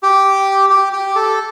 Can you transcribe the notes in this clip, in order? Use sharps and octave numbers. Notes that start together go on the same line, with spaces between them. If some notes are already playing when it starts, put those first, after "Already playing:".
G4
G4
G4
A4